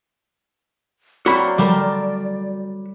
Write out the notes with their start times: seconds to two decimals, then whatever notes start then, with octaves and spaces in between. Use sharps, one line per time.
1.26 F#3 A#3 C4 F#4 D5 B5
1.58 G3 A3 A#4 C5